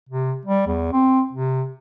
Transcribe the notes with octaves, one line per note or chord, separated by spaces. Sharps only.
C3
G3
E2
C4
C3